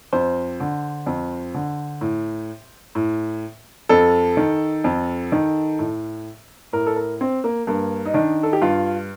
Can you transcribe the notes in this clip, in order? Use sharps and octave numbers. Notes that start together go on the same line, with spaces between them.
F2 C5
D3
F2
D3
A2
A2
F2 A4
D#3
F2
D#3
A2
A2 A#4
A4
A#4
C4
A#3
G2 A#3
D#4
D#3 D4
A4
G4
G2 F4